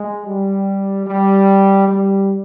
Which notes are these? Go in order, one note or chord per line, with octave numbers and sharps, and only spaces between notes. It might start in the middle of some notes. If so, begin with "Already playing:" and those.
Already playing: G#3
G3
G3
G3